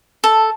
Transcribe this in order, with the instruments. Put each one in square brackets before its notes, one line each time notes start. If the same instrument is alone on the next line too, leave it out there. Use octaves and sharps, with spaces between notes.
[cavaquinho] A4